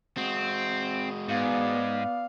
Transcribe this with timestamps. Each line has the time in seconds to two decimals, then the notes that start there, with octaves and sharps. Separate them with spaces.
0.17 G#3 C4 F#4
1.29 G#2 B3 D5 F5